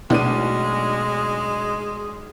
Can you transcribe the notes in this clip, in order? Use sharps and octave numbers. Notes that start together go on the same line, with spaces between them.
B1 B2 G#3 A3 D4 D#7